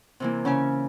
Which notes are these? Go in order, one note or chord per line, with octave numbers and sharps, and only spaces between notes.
C3 E3 A#3
C#3 C#4 E5 G#5